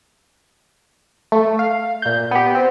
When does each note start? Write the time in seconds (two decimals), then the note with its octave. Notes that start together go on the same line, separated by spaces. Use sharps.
1.32 A3
1.59 F5
2.02 A#2 G6
2.31 B3 G4
2.55 C4